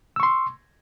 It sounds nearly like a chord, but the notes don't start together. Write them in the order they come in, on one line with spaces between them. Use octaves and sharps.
E6 C#6 C6